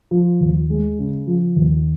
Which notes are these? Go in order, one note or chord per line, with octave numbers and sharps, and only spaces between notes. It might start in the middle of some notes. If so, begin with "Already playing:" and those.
F3
D#2
G#3
C#3
F3
D#2